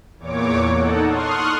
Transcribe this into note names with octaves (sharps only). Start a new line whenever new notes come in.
E2 A#2 C#5 D6
D#4 A4 F#5
C6 C#6 D#6 F6 F#6